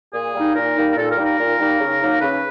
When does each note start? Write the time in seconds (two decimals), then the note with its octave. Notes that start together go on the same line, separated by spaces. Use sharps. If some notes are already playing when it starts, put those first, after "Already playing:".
0.13 A#2 G#4
0.34 G3 A#3 D#4
0.55 A#2 A#4
0.75 G3 A#3 D#4
0.90 A#4
0.96 A#2 A4
1.10 A#4
1.17 G3 A#3 D#4
1.24 A#4
1.38 A#2
1.59 G3 A#3 D#4
1.80 C#3
2.01 F#3 A#3 D#4
2.21 C#3 B4